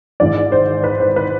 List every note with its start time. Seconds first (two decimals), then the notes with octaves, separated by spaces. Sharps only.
0.20 G#1 G#2 E3 D5
0.52 C5
0.84 B4
1.00 C5
1.16 B4